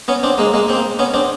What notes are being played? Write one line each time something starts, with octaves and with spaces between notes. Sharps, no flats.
B3 C#4
C4 D4
G#3 A#3
G#3 A#3
A#3 C4
B3 C#4
C4 D4